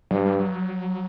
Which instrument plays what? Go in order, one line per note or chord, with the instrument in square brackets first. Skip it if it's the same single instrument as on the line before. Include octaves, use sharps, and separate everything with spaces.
[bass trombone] G2 [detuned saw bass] F#3
[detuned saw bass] G3
F#3